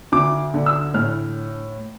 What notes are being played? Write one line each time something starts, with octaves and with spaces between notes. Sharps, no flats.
D2 D6
D3
E6
A2 F6